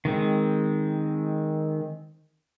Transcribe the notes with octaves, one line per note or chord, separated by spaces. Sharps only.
D#3 G#3 C4